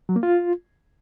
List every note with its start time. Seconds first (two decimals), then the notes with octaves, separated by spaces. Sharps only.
0.09 F#3
0.16 A#3
0.23 F4